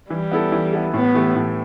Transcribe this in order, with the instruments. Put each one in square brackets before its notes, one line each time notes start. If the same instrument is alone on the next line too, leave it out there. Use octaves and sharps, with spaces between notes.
[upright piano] E3 [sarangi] G3
[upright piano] B3 E4 A4
E3
B3 E4 A4
[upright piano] A2 [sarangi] B3
[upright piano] E3 A3 E4 G4
A2